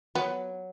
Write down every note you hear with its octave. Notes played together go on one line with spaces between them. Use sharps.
F#3 B3